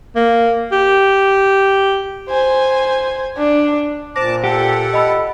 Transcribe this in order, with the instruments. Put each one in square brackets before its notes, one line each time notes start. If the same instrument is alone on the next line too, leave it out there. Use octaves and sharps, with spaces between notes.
[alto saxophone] A#3
G4
[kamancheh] C5 G#5
D4
[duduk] A#2 [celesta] C5 A#6 [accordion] A5 D6
[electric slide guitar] G4 [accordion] A4 F#5
[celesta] D#5 B5 E6